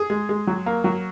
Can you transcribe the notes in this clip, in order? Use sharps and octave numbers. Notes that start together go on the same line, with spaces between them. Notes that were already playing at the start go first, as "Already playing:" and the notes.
Already playing: G#4
G#3
G#3
F#3
A#3
F#3